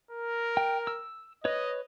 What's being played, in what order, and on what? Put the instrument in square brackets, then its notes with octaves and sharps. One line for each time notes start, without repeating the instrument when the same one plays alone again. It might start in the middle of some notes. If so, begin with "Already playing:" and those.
[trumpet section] A#4
[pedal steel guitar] G5
E6
[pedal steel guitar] B4 C#5 [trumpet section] D#5